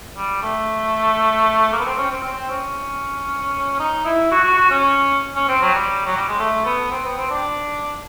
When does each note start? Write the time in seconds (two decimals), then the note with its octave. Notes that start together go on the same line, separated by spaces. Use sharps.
0.17 G3
0.43 A3
1.72 A#3
1.79 B3
1.85 C4
1.98 C#4
2.11 C4
2.24 C4
2.50 C#4
3.80 D#4
4.05 E4
4.31 F#4
4.44 F#4
4.58 F#4
4.71 C#4
5.35 C#4
5.49 C4
5.62 F#3
5.74 G3
6.06 F#3
6.17 G3
6.28 G#3
6.39 A3
6.65 B3
6.91 C4
7.05 B3
7.18 C4
7.31 D4